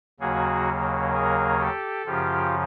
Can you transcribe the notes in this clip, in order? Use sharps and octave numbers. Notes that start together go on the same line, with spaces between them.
D#2 C#3 F#3 A#3 F#4 G#4
G#4 A#4
G4 A4
F#2 C#3 F3 F4 G4